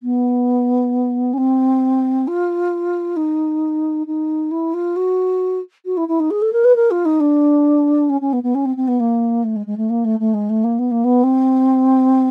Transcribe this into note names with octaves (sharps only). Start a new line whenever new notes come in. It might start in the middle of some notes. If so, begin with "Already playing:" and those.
B3
C#4
C4
F4
D#4
D#4
E4
F4
F#4
F#4
E4
E4
D#4
G#4
A4
A#4
B4
A#4
F4
D#4
D4
C#4
C#4
B3
B3
C#4
C4
C4
B3
A#3
A3
G#3
G#3
A3
A#3
A3
A3
G#3
A3
A#3
B3
A#3
B3
C4